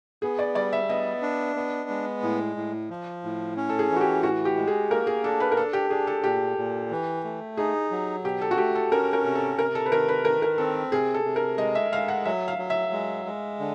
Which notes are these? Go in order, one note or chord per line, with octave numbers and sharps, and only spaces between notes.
B3 G#4
D5
G3 D5
E5
B3 D#5
D4
B3
G#3
A2
A2
F3
A2
C#4
A4
G#4
E3
F#4
G4
A2 F#4
G4
G#3
G#4
A#3 A#4
G#4
D4 A4
B4
A#4
D4 A4
G4
D4 G#4
A4
A#2 G4
A#2
E3
A3
D#4 G#4
F#3
B2 G4
A4
F#4
A3 G4
A4
C#4 A#4
A#4
C3
A4
C3 A#4
A4
B4
D#3 A#4
B4
D#3 A#4
A#4
C4 A4
C3 G#4
A4
C3
A#4
G#3 D#5
E5
G#3 F5
F#5
F#3 E5
F5
F#3
E5
G#3
G#3
D3